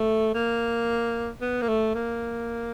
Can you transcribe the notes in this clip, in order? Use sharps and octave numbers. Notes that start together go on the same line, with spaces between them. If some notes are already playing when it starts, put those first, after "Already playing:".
Already playing: A3
A#3
B3
A#3
A3
A#3